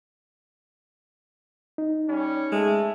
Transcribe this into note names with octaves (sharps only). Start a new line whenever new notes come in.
D#4
G3 C#4
G#3 A3